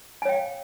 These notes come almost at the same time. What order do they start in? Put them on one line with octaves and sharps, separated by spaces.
G#5 C#5 G5 F5